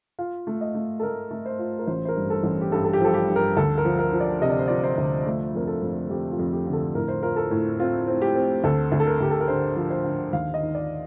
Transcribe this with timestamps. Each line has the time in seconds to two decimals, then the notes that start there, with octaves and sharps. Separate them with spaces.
0.19 F4 F5
0.47 A3
0.61 D#5
0.75 A3
1.00 A4
1.03 A3 A#4
1.31 A3
1.46 C5
1.59 F4
1.79 A#4
1.87 A1 C5
2.05 C5
2.08 A#4
2.16 G2
2.30 A4
2.43 A1
2.61 G4
2.72 G2 A4
2.85 A4
2.93 G4
3.01 F3 A4
3.14 G4
3.29 G2
3.36 A#4
3.57 D2 A4
3.78 A#4
3.85 F3
3.99 A#4
4.13 F3
4.20 D5
4.41 C3 D#5
4.50 D5
4.59 C5
4.68 F3 D5
4.84 C5
4.97 D2
5.26 A3
5.54 F2 A#4
5.67 A4
5.82 F2
6.10 F2 G4
6.32 F4
6.39 F2
6.53 G4
6.66 D3
6.73 A4
6.95 A2 A#4
7.08 C5
7.23 F4 A#4
7.36 A4
7.51 A2
7.79 C4 F4
8.08 C4
8.22 G4
8.35 C4
8.64 D2 A4
8.92 D2
9.00 A4
9.06 A#4
9.20 D2 G4
9.31 A4
9.40 A#4
9.48 D3 C5
9.76 F3
9.91 C5
10.04 D3
10.33 D#2 F5
10.54 D#5
10.61 D#3
10.75 D5